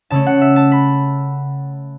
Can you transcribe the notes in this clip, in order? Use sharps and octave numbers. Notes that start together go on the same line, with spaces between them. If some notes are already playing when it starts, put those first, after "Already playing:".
C#3 A3 C#4 A5
F#5
E5
A5
B5